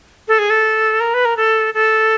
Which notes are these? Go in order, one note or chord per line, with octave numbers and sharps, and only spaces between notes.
A4
G#4
A4
A#4
B4
A#4
A4
A4